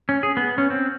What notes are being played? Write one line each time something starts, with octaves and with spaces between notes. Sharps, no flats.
C#4
G#4
B3
C#4
C4